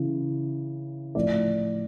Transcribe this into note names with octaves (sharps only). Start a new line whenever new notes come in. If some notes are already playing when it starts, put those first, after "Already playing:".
Already playing: C#3 E3
A2 F3 D5